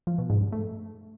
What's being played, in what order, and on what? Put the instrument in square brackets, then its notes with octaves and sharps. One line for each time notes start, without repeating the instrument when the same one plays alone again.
[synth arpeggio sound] F3
B2
G#2
G2
A3